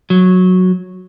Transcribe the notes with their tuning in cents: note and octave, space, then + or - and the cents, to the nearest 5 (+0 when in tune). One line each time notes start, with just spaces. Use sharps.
F#3 -10